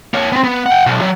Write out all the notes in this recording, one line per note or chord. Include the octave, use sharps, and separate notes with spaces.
A#3 C#5
B3 C4
B3
F#5 G5
B1
F#3